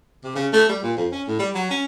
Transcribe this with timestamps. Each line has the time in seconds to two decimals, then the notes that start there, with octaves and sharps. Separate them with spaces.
0.24 C3
0.35 C#3
0.53 A3
0.69 G3
0.83 A#2
0.97 F2
1.12 C#4
1.27 A2
1.39 G3
1.55 F#3
1.70 C#4